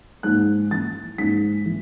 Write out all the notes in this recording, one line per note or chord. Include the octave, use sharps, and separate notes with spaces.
G#2 F#6
E3 A6
G#2 B6
E3